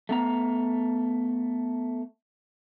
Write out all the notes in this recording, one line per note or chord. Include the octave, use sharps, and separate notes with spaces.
A3 B3 A#5